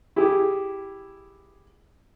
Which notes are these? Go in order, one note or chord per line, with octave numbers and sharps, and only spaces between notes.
E4 G4 G#4